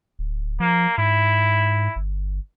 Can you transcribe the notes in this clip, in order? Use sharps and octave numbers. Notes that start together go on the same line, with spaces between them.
D1
F3 A#3
G#2 E4
G1